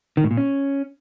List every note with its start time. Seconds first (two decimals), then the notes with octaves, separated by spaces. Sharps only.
0.17 D#3
0.24 A2
0.31 A#2
0.37 C#4